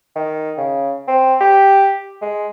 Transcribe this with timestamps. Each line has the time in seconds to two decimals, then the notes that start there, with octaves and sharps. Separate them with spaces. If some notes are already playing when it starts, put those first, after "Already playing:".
0.16 D#3
0.58 C#3
1.08 C4
1.41 G4
2.22 G#3